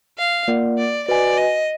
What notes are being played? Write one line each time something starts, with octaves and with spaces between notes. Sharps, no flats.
F5
A#3 F4 A#4 D5 F#5
D5
F#4 B4 D5 D#5 G#5
D#5